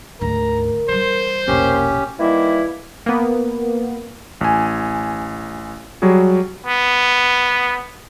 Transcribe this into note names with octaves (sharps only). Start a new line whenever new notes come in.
D2 G#2 A#4 A#5
E3 G3 C5
E1 A#1 A#3 C#4 G4
D#3 E3 G3 A#3 E4
A#3 B3
A1 G#5
F#3 G3 F#4 G#4
B3